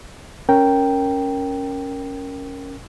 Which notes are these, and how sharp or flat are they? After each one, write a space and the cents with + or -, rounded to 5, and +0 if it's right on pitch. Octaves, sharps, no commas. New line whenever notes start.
C#4 +0 A#4 +0 G5 +0